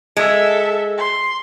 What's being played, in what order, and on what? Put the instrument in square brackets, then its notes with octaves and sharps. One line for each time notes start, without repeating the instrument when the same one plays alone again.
[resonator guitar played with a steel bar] G#3 [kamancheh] A4 E5
[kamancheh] C6